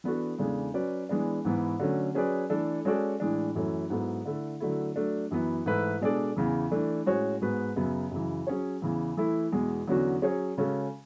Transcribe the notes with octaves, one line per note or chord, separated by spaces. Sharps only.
E3 B3 D4 F#4 A4
E2 C#3 G#3 D4 A4
F#3 C#4 F#4 B4 D5
E3 G#3 B3 D4
G#2 E3 B3
D3 F#3 A3 C#4
F#3 C#4 G#4 B4 D5
E3 A3 D4 A4
G#3 C#4 F#4 A4 D5
A2 E3 G#3 D4
F#2 E3 A3 C#4
G#2 F#3 B3 E4 A4
D3 A3 E4 A4
D3 F#3 A3 E4
F#3 A3 D4
F#2 E3 B3
G#2 E3 A3 E4 B4
B2 G#3 D4 A4 D5
E2 C#3 E3
E3 A3 D4
A2 G#3 C#4 F#4 C#5
G#2 G#3 B3 F#4 B4
F#2 C#3 F#3 B3
F#2 C#3 E3
F#3 C#4 G#4 C#5
E2 C#3 E3
E3 A3 E4
E2 B2 G#3
E2 D3 F#3 C#4 F#4
F#3 C#4 G#4 C#5
C#3 G#3 C#4 F#4 A4